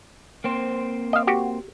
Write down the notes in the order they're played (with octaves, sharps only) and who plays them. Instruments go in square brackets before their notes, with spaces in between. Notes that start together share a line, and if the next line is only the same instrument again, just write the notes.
[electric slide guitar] A#3 C4 C5
[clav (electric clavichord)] D#5 F5
F#4 G4